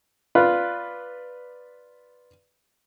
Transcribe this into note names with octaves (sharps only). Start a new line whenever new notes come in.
F4 B4 D5